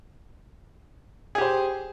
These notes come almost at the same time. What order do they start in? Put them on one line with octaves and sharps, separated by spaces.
G#4 G4 C5